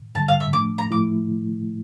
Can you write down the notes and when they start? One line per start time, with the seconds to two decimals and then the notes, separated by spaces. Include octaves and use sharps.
0.15 G2 D3 G3 A5
0.28 F5
0.40 E5
0.53 A2 F3 A3 D4 D6
0.78 A#5
0.91 A2 F3 A3 E4 D6